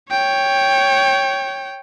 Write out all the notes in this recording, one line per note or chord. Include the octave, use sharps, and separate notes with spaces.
C#5 G5